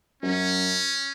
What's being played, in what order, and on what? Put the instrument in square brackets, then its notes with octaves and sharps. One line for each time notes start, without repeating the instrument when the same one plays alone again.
[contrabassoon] F#2 [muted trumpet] C#4